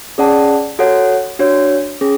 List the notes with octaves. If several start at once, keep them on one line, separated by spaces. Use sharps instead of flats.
C#4 G#4 D5 F#5 A5
F#4 A4 C#5 F#5
D4 F#4 C#5
C#4 G#4